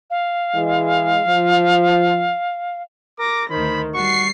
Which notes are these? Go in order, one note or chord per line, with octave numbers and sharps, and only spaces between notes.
F5
E3 G#3
F3
A#4 D6 A#6
D2 D#3 C5 B5
G3 F#4 C#6 C7